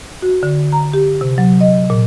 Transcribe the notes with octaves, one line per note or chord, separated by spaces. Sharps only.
F#4
D3
A#5
G4
C3
F#3
D#5
A#2